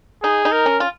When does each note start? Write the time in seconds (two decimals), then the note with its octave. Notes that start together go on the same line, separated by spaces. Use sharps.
0.23 D#4 G#4
0.45 D#4
0.52 A#4
0.66 C#4
0.80 F4